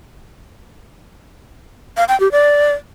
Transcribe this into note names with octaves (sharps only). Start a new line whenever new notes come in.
F5
G5
G4
D5